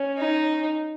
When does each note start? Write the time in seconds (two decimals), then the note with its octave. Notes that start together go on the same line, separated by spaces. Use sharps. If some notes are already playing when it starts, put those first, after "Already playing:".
Already playing: C#4
0.18 D#4